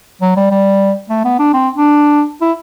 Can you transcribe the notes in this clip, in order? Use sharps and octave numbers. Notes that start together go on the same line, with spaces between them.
F#3
G3
G3
A3
B3
D4
C4
D4
E4